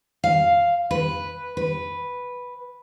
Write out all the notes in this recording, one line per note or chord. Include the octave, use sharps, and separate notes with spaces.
F5
B4
B4